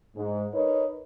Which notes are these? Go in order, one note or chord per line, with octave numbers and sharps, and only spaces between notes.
G#2
D#4 A#4 B4 C#5